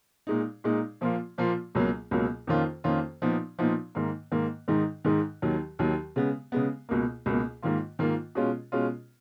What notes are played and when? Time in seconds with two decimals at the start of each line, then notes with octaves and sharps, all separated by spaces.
0.27 A#2 G#3 D#4
0.64 A#2 G#3 D#4
1.01 A#2 F3 A#3 F4
1.38 A#2 F3 A#3 F4
1.75 C#2 B2 F#3 A#3
2.11 C#2 B2 F#3 A#3
2.47 F2 D#3 A#3 C#4 F4
2.84 F2 D#3 A#3 C#4 F4
3.22 A#2 F3 B3 D#4
3.59 A#2 F3 B3 D#4
3.95 G#2 D#3 A#3
4.31 G#2 D#3 A#3
4.68 G#2 D#3 G#3 D#4
5.05 G#2 D#3 G#3 D#4
5.42 D#2 D#3 F#3
5.79 D#2 D#3 F#3
6.16 C#3 G#3 B3
6.52 C#3 G#3 B3
6.89 C#2 B2 A#3
7.26 C#2 B2 A#3
7.62 G#2 D#3 A#3 F4
7.99 G#2 D#3 A#3 F4
8.35 B2 G#3 C#4 F4
8.72 B2 G#3 C#4 F4